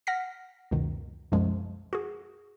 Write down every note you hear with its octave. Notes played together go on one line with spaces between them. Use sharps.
F#5 F6 A#6 B6
C#2 F#2 B2 D#3
C2 F#2 B2 F3 G#3
F#4 G#4